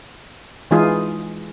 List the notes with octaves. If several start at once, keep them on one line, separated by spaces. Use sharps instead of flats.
E3 G#3 D#4 F4 G#4